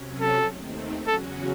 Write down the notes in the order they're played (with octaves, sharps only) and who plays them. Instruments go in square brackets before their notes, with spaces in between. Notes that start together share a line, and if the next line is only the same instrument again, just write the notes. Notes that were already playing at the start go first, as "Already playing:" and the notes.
Already playing: [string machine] C3 F#3 C#4
[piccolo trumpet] A4
[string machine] D#2 D#3 A3 C4
[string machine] E2 C#3 F#3 C#4 F#4 [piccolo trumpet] A4